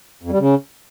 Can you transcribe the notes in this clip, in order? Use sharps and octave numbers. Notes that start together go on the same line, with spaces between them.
F2
G3
C#3